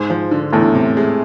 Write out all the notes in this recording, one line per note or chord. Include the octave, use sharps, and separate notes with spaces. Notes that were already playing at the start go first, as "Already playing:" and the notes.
Already playing: G#2
F3
D3
E2 A2
C3
G#3